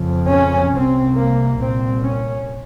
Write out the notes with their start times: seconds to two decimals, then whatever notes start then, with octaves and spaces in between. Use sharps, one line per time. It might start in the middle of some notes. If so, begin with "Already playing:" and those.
Already playing: F2 C#3
0.30 C#4
0.73 C2 C3 C4
1.16 A#3
1.59 C2 A#2 C4
2.03 C#4